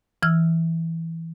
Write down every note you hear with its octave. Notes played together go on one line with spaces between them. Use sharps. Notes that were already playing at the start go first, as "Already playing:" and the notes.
E3 E6 F6